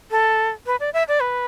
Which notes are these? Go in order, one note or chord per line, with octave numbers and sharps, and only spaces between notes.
A4
B4
D5
E5
D5
B4